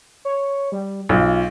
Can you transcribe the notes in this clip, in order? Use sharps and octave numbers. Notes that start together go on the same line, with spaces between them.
C#5
G3
B1 F4